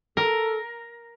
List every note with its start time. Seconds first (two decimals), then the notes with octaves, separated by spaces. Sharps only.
0.17 A4 A#4